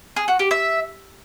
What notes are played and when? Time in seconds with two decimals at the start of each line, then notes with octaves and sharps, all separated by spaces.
0.16 G#4
0.28 F#4
0.39 G4
0.51 E5